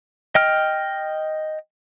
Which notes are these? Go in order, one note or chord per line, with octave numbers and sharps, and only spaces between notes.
D#5 G5 F6